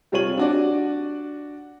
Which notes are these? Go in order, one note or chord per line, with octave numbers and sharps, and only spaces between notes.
C3 G3 F4 C#5 D#7 F#7
D4 F#4 D5